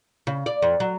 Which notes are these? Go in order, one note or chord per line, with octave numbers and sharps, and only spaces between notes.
C#3
D5
F2
F#3